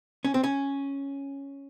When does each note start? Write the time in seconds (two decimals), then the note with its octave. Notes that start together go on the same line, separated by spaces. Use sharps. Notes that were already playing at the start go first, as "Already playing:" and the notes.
0.25 C#4
0.34 C4
0.43 C#4